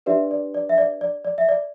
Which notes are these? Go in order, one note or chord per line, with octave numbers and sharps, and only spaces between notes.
D4 G4 B4 D5 E5
D5
D5
E5
D5
D5
D5
E5
D5